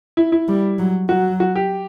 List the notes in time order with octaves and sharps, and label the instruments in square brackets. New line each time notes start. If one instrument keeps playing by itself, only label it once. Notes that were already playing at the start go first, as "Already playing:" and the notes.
[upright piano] E4
E4
[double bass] G3
F#3
[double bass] F#3 [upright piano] F#4
[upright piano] F#4
G4